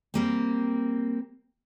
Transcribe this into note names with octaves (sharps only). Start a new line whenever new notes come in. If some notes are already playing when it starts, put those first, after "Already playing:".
G3 A#3 C4